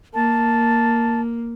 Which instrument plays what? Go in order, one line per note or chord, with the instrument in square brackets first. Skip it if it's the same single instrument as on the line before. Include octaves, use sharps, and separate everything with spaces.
[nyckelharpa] A#3 [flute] A5